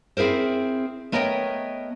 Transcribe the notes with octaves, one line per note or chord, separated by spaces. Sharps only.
C4 E4 G#4 A#4 C5
A3 B3 A#4 C#5 D#5 G5